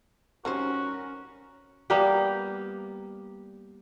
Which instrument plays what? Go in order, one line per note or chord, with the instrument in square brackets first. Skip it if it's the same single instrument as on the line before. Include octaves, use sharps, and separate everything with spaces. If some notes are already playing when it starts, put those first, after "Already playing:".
[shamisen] G3 D#4 C5 [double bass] C#4 [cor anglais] F#4 [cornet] A#4
[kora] G3 A#3 B3 G4